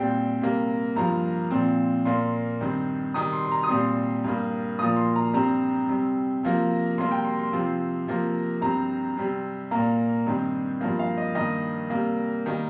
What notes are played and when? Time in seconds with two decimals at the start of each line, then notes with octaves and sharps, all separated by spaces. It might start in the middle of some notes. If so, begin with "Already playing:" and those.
Already playing: A#2 G3 C4 G5
0.41 C3 G3 A#3
0.96 G2 F3 A#3 A#5
1.51 A#2 F3 C4
2.05 A#2 A#3 C6
2.61 G2 D#3 C4
3.14 C3 D#3 G3 D#6
3.33 C6
3.45 C6
3.52 A#5
3.63 D#6
3.69 A#2 G3 C4 C6
4.24 G2 G3 A#3
4.79 A#2 F3 A#3 D#6
4.97 C6
5.16 A#5
5.34 G2 G3 C4 A#5
5.88 C3 G3 C4
6.43 C3 F3 A#3
6.98 C3 G3 A#3 C6
7.11 G5
7.25 C6
7.39 C6
7.53 C3 F3 C4
8.07 C3 F3 A#3
8.61 G2 G3 C4 A#5
9.17 C3 G3 C4
9.71 A#2 A#3 A#5
10.27 G2 D#3 G3 C4
10.81 G2 F3 A#3
10.99 F5
11.17 D#5
11.35 G2 D#3 G3 A#3 D#5
11.90 C3 G3 A#3
12.46 D#3 G3 A#3